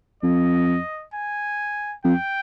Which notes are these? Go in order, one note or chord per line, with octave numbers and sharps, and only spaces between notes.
F2 D#5
G#5
F2 G5